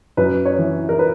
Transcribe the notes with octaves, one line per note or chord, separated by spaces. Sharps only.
F#2 B4
C#5
E3
A#4
B4